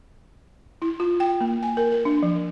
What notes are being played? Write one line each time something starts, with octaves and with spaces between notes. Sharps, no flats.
E4
F4
G5
A#3
G#5
A#4
A#4
D4
F3